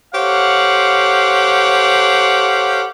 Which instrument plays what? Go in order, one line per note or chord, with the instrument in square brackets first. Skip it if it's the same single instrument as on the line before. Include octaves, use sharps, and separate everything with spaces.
[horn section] G4 A4 C5 C#5 F5 F#5